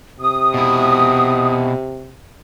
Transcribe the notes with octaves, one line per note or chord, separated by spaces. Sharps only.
C3 D#6
B2 E4